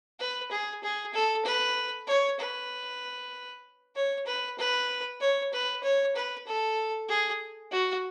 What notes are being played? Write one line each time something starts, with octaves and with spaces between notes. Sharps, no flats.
B4
G#4
G#4
A4
B4
C#5
B4
C#5
B4
B4
C#5
B4
C#5
B4
A4
G#4
F#4